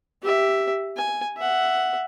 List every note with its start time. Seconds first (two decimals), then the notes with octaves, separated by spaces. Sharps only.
0.22 G4 E5
0.97 G#5
1.37 E5 F#5